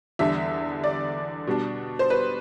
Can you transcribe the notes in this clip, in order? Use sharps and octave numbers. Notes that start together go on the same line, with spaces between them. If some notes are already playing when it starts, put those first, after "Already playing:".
E2 D3 G3 D4 E5
D5
B2 G3 D4
C5
B4